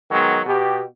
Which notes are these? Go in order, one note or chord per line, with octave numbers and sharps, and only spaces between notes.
D#3 F#3 G#3 B3
B2 G4